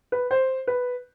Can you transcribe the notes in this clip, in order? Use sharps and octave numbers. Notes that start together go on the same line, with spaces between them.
B4
C5
B4